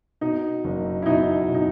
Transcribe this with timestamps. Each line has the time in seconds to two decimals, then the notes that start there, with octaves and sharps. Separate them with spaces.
0.21 B2 D#4
0.64 F#1
1.02 E4
1.06 B2 D#4
1.49 B2
1.54 D#4